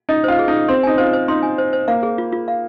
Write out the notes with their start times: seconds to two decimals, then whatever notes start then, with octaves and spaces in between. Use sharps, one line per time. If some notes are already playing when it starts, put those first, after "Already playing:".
0.09 D#4 D#5
0.24 F4 C5
0.39 G#4
0.48 D#4
0.53 G#4
0.68 C4 C6
0.83 D#4 G#5
0.98 F4 C5
1.13 C5
1.28 D#4 C6
1.43 G#5
1.58 C5
1.73 C5
1.88 A#3 F5
2.03 G#4
2.18 F4
2.32 F4
2.48 F5